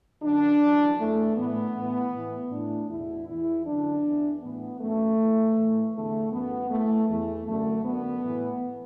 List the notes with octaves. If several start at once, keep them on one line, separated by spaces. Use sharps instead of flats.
F#2 D3 D4
F#2 E3
E2 E3 A3
A2 E3 B3
A2 E3
A2 E3
A2 E3 D4
E2 B2 E4
E2 E3 E4
F#2 D3 D4
E2 E3
A2 E3 B3
F#2 E3 A3
A2 E3
A2 E3
E2 D3 A3
F#2 E3 B3
A2 E3 A3
E2 E3 A3
F#2 D3 A3
F#2 D3 B3
A2 E3